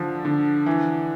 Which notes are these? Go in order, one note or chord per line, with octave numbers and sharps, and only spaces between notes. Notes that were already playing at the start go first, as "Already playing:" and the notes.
Already playing: D3 F3
D3
E3